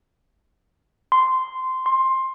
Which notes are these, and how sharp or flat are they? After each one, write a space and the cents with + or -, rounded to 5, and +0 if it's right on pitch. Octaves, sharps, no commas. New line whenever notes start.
C6 -15
C6 +15